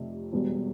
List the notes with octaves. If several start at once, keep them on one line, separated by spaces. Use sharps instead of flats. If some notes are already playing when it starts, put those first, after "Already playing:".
Already playing: F1 F2 C3
E1 E2 B2 G3